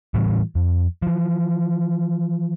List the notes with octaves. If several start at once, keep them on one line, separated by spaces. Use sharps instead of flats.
A2 E3 G3
F2
E3 F3